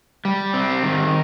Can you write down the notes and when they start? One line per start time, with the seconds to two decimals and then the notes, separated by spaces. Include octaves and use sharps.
0.25 G3
0.54 C4
0.83 D#3